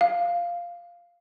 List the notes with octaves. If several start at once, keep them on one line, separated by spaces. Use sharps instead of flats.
F5